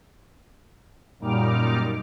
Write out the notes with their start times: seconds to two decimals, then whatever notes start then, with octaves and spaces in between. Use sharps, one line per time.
1.19 F#2 A#2 G3 D#4 D6 F6